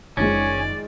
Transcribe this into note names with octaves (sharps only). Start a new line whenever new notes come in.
F#1 D#3 F3 G#3 C#4 D5